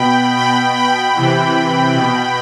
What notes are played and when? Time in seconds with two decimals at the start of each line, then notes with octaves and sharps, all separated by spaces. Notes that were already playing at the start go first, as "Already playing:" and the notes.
Already playing: B2 G5 B5
0.36 B2 G5 B5
0.76 G5 B5
1.16 C3 E3
1.95 B2